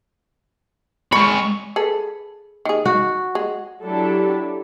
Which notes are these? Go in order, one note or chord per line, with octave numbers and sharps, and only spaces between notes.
G#3 B5 C#6
G#4 A4 B4
D#3 G#4
F#4
G#3
F#3 D4 E4 G4 A4